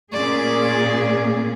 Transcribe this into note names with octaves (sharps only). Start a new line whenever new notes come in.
A#2 C#4 G#4 D5